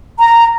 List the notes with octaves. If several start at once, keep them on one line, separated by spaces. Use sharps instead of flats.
A#5